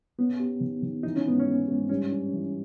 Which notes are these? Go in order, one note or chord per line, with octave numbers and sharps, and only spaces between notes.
B3 C#4
G4
D#3
D#3
E3 D#4
C#4
G#2 B3
C#4
G#3
G#2
G2 C#4
D#4
E3